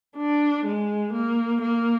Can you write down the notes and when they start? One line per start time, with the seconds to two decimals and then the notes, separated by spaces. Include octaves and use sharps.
0.16 D4
0.65 G#3
1.13 A#3
1.62 A#3